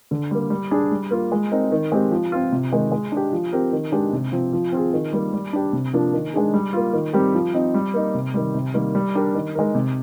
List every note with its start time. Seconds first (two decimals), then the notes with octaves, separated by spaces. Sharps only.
0.11 D3
0.31 G3 A#3
0.50 G3
0.71 D4 G#4
0.91 G3
1.11 A#3 F4
1.32 G#3
1.51 C4 D#4 A#4
1.72 D#3
1.92 G#3 C4 D#4 G4
2.11 F3
2.32 C4 F4
2.52 C3
2.71 D#3 G#3 D#4
2.92 G#3
3.12 D4 G4
3.32 F3
3.52 C4 G4 A#4
3.72 D#3
3.92 G#3 D4 G4
4.13 C3
4.32 F3 C4
4.53 F3
4.72 C4 F4 G#4
4.93 D#3
5.13 G3 A#3
5.34 G3
5.53 D4 G4
5.73 C3
5.93 F3 A#3 D4
6.13 D#3
6.34 G#3 D4 G#4
6.54 G3
6.73 A#3 F4
6.93 D#3
7.13 G3 C4 G4 A#4
7.34 F3
7.54 C4 D#4
7.74 G3
7.94 A#3 D#4
8.15 C3
8.34 D#3 G3
8.54 C3
8.74 D#3 G3 A#3
8.95 G3
9.15 D4 G4 A#4
9.35 D#3
9.55 G#3 D#4 A#4
9.75 C3